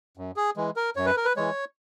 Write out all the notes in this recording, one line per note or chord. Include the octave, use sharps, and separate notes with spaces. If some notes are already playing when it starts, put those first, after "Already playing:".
F#2
G#4
E3 G#3
A#4
F#2 C#5
B4
A#4
B4
E3 G#3 C#5